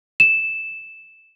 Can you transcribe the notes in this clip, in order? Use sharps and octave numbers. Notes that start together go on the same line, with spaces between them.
E7